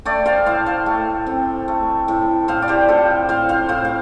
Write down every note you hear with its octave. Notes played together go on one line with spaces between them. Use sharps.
A3 D5 G5
C5 F5
A2 C5 F5
C5 F5
A3
C4
A3
A2
A2 C5 F5
D5
G4 C5
A2 F4 A4
A2 C5 F5
C5 F5
A2 C5 F5
F5